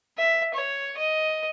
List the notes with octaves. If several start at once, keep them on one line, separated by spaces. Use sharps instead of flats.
E5
C#5
D#5